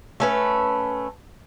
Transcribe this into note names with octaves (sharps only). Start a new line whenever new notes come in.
A3 C#4 B4